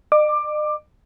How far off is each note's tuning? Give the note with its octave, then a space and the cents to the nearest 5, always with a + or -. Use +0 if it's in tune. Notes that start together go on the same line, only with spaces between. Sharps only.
D#5 -45 D6 +15